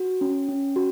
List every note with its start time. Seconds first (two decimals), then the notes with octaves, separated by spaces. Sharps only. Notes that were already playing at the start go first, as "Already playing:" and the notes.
Already playing: F#4
0.21 C#4
0.49 C#4
0.76 F#4